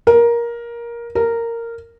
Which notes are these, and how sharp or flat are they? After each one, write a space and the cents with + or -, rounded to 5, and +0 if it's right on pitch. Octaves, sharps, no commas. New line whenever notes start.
A#4 +15
A#4 -10